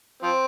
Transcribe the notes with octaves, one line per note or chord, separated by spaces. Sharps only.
F3 C4